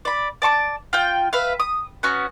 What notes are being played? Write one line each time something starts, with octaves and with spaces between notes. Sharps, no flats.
D5 B5
D5 A5 C#6 D6
F4 G5
B4 E5 F5
D#6
B3 C#4 F#4